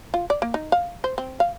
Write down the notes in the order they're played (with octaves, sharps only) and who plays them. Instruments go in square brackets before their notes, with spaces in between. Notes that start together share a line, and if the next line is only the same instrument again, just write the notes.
[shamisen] F4
D5
A#3
D#4
F5
C5
C4
F5